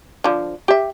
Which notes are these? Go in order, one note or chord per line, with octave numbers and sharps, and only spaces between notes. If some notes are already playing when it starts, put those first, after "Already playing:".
D3 F3
G4 E5